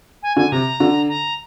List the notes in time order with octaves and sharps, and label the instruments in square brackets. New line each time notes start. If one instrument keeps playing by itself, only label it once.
[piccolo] G#5
[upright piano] D3 [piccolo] G#5
[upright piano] C3 [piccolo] A#5
[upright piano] D3
[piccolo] A#5